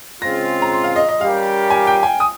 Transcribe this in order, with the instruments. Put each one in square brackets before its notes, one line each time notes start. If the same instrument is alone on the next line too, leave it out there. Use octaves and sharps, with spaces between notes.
[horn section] C#3 G#3 C4 F4 [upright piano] A#6
[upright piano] A#5
C6
F5
D#5
D#5
[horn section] G3 C#4 G4 A#4 [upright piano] F5
[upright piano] G#5
G5
G#5
D#6